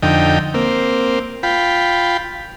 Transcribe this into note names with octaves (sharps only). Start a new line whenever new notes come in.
F2 D3 D#4 G5
A#3 C4
F4 G5 B5